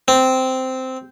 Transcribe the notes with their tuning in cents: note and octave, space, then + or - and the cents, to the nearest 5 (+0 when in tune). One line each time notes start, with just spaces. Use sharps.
C4 -10